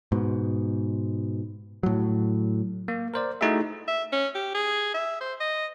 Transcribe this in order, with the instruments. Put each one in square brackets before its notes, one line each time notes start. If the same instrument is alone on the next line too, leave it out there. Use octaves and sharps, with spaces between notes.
[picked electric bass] G#2 B2
A2 F#3
[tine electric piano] A#3
A#4 C5 D5
A3 D#4 E4 F#4 G#4 E5
[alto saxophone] E5
C#4
G4
G#4
E5
C5
D#5